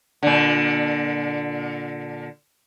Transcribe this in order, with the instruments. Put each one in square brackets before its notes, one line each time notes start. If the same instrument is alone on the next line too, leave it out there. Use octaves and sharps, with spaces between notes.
[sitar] A#2 D3